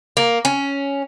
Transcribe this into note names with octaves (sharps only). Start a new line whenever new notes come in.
A#3
C#4